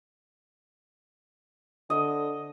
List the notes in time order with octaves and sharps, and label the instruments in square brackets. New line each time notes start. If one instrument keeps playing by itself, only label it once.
[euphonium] D3 [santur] D#5